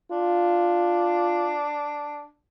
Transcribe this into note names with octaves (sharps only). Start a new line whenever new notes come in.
D4 F4